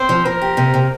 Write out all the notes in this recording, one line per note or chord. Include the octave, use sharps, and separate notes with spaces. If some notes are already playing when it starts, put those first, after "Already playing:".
Already playing: C4 C5
F3
F3 A#4
G4
C3
C3